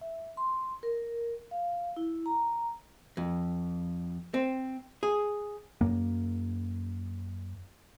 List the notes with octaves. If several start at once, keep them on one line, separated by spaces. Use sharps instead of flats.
E5
C6
A#4
F5
E4
A#5
F2
C4
G#4
F#2 A#3